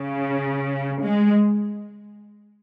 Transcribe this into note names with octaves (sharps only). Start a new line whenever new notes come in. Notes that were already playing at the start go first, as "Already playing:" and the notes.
Already playing: C#3
G#3